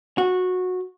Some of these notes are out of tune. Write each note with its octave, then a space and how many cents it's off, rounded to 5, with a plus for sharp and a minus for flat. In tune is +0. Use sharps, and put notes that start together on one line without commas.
F#4 -15